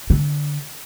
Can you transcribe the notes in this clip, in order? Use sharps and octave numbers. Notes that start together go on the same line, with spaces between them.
D3